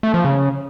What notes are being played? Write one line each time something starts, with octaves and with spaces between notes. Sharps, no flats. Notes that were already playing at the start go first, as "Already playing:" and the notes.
A3
F3
C#3